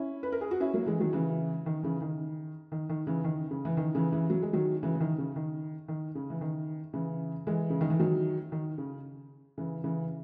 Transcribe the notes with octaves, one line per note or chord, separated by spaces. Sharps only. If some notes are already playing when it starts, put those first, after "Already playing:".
Already playing: C#4 E4
B4
A#4
G#4
F#4
C#4 E4
F#3 A#3
E3 G#3
D#3 F#3
C#3 E3
D#3
C#3 E3
D#3
D#3
D#3
C#3 E3
D#3
C#3
E3
D#3
C#3 E3
C#3 E3
F#3
G#3
D#3 F#3
C#3 E3
E3
D#3
C#3
D#3
D#3
C#3
E3
D#3
C#3 E3
E3 G#3
C#3
D#3
E3
D#3 F#3
D#3
C#3
C#3 E3
C#3 E3